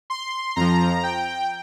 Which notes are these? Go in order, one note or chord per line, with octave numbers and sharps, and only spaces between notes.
C6
F2 F3 A#5
G5